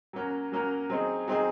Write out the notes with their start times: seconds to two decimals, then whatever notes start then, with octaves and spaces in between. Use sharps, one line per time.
0.13 F#3 A#3 C#4 F#4 A#4
0.52 F#3 A#3 C#4 F#4 A#4
0.90 F#3 C4 D#4 G#4
1.28 F#3 C4 D#4 G#4